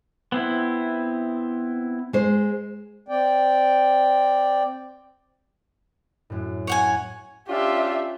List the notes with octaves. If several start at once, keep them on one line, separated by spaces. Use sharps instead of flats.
B3 C4 E4
G#3 C5
C4 D5 G5
F#2 A2
C#5 F#5 G#5
C#4 D4 F4 G4 E5